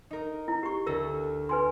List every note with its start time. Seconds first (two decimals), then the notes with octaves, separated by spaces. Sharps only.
0.11 D#4 A#4
0.48 E4
0.63 G4 C#6
0.86 D2 A4 A#4 A#6
1.49 B4 G#5 C6